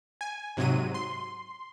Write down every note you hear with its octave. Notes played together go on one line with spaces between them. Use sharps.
G#5
G#2 C3 F#3 D#7
C6